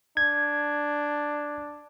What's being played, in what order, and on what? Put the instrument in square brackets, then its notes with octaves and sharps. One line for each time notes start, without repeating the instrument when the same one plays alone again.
[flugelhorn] D4 [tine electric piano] G#6